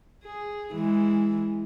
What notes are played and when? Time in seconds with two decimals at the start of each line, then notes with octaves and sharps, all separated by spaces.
0.25 G#4
0.73 E3 G#3